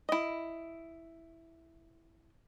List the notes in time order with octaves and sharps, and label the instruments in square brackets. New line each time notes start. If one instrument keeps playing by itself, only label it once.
[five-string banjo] E4 D#5